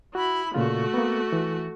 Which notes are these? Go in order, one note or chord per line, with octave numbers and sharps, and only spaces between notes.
E4 F#4 B5
A#2 C#3 A3 F4 F#4
A#3 B3
E3